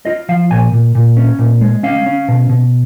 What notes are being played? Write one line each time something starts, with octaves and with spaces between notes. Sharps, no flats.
F4 D#5
F3 F5
A#2 G#5
A#2
A#2
C#4
A#2
G#3
C#4 F5
C#4
B2
B2